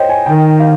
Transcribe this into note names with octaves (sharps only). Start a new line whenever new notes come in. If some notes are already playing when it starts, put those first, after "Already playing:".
Already playing: C5 C#5 D#5 G5
G#5
D#3 G5
F5